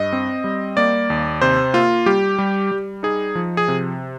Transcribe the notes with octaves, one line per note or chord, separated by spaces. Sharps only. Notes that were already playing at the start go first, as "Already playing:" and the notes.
Already playing: G2 D#5
C4
G3
A#3 D5
D#2
C3 C5
A#3 F4
G3 G4
G3
G3
D#4 G#4
F3
G#4
C3